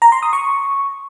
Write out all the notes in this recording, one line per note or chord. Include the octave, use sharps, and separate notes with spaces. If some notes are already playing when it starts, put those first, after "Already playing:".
A#5
C6
D#6
C#6